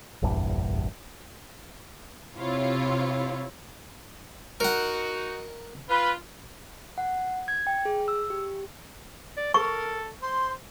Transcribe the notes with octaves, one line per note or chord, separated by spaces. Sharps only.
F1 A#1 E2 G2
C3 E4 F4 C#5
D#4 F#4 A#4 F#5
F4 B4
F#5
G#6
G5
G#4
E6
G4
D5
A4 A#4 C#6
C5 C6